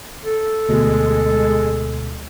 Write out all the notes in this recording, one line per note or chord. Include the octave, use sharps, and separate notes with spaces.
A4
D2 B2 G#3